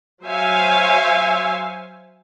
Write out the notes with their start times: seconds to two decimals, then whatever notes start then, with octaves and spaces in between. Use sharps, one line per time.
0.24 F#3 C5 C#5 E5 F5 G#5